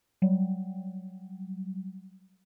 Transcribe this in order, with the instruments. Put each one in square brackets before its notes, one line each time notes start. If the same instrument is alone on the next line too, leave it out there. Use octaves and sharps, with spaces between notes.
[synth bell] F#3 G3